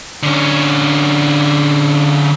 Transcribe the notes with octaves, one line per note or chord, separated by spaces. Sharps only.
D3 C#4